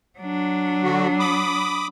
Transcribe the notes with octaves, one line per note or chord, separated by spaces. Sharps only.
F#3 D4
D3 F#4
B5 D6 D#6